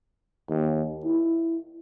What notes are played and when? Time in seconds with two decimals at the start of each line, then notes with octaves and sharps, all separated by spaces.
0.50 D#2
1.04 E4